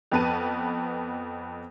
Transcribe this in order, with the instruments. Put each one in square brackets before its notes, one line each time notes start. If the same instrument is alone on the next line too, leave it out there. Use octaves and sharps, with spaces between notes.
[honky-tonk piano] F2 B3 B4 A5 D#7